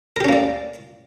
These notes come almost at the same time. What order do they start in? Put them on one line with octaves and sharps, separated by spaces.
A#4 G4 C#4 A#3 D5